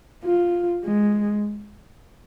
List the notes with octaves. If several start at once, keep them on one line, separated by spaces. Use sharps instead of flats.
F4
G#3